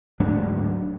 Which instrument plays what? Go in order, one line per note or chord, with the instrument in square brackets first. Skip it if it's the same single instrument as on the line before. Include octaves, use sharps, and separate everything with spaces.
[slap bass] D1 G#2 F#3 D4